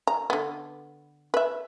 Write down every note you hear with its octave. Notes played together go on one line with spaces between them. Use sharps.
A#5
D3 B3
B4 E5